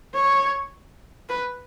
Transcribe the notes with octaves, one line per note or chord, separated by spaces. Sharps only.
C#5
B4